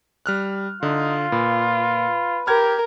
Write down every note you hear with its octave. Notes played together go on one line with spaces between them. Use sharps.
G3 F6 F#6
D3 D#4 F4
A#2 B4
G4 A#4 F6 G#6